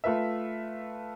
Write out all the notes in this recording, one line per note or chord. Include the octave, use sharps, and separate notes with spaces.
A3 F4 B4 E5